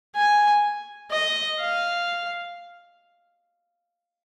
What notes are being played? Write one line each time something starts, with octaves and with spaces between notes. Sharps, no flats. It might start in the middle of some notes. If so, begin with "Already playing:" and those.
G#5
D#5
F5